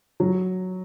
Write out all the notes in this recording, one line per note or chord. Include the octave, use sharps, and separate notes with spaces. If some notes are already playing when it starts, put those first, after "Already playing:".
F#3